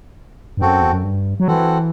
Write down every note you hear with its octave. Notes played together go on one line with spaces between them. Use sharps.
G2
F#2 C4 F#4 A4
E2
F#2
G2
F#3
E3 C4 F#4 A4